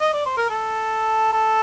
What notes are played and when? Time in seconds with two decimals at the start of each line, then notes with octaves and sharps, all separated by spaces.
0.01 D#5
0.13 D5
0.26 C5
0.37 A#4
0.50 A4
1.33 A4